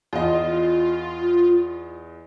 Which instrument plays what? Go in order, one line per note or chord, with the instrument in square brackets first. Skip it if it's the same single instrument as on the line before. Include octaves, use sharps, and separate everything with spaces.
[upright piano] E2 D#5 [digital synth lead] F4